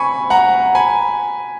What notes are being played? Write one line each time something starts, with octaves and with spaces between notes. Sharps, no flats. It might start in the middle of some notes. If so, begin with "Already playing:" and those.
Already playing: G#5 B5 C#6
F#5 A#5
G#5 B5